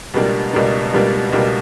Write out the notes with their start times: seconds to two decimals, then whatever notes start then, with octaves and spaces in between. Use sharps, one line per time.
0.14 C#2 B2 G3 A#3 D4
0.53 C#2 B2 G3 A#3 D4
0.94 C#2 B2 G3 A#3 D4
1.33 C#2 B2 G3 A#3 D4